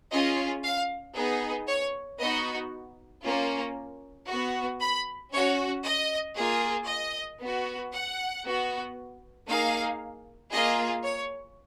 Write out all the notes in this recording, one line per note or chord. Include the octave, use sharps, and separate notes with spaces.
C#4 F4 G#4 D#5
F5
B3 D#4 G#4
C#5
B3 D#4 F#4 D#5
A#3 C#4 F4
B3 F#4
B5
C#4 F#4 C#5
D#5
A#3 F4 G#4
D#5
B3 F#4
F#5
B3 F#4
A#3 D#4 G#4 F5
A#3 F4 G#4 D#5
C#5